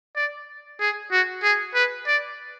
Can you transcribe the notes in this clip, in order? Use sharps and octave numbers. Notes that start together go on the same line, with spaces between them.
D5
G#4
F#4
G#4
B4
D5